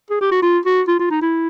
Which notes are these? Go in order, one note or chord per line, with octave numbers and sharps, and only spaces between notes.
G#4
G4
F#4
F4
F#4
F4
F4
D#4
E4